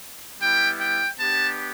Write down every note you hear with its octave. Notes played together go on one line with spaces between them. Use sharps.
G3 B3 E4 G5
G5
B3 D4 G4 A5